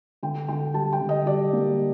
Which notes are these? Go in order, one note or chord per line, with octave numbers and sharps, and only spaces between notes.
D3 G5
D3 G5
G3 A5
G5
D3
D#5
G3 D5
A#3